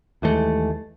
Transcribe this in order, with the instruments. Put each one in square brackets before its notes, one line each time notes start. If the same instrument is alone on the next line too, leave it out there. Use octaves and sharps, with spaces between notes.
[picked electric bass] D#2 E3 G#3 A3